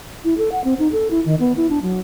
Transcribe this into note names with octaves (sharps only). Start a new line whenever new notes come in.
E4
A4
F#5
C4
D#4
A4
E4
D#3
B3
E4
D4
F#3